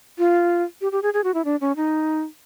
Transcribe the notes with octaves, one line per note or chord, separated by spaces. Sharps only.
F4
G4
G4
G#4
G#4
F#4
E4
D4
C#4
D#4